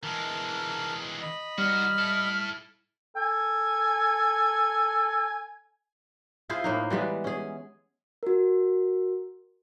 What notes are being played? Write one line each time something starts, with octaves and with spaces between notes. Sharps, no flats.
E3 G#3 A#4 A5
D#5 B5
D#3 G3 F#4 F6
E4 A4
A4 G#5
E4 F4 G#4 C5
A2 A#3 D#4
E3 G3 G#3 B3
C#4 G#4
F#4 A#4